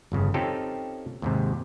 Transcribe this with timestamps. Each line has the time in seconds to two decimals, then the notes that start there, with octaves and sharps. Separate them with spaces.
0.12 G1 F2 C#3
0.34 C4 C#4 D#4 F4 G4 A4
1.22 D#2 G#2 C3